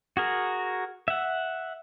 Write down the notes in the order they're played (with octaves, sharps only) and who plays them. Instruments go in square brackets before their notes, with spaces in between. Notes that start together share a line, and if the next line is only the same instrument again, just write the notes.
[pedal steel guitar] F#4 G#4 A#4
E5 F#5